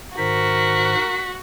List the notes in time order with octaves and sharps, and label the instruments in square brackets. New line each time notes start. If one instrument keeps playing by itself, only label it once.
[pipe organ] G#2 D#3 C5 [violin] F#4 [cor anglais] A#4 [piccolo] B6